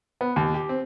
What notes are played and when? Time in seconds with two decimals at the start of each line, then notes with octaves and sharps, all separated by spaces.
0.21 B3
0.36 D#2
0.54 G4
0.69 C4